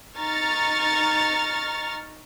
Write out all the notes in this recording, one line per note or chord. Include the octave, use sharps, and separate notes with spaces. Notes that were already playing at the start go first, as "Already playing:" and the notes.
D#4 A#5 C#6 F6 A6